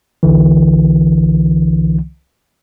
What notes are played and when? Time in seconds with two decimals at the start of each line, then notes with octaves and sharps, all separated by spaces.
0.23 C2 D3 E3